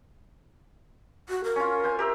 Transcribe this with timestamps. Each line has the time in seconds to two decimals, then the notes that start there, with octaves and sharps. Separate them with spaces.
1.29 F#4
1.44 A#4
1.56 C#4 F4
1.84 C5 G#5
1.99 G4 A#4 E5